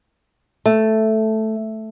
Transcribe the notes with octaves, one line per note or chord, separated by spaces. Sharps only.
A3